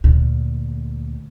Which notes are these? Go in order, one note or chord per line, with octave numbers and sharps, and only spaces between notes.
D2 A#2